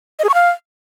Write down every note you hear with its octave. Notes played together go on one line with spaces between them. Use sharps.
D#5
G#4
C#6
F5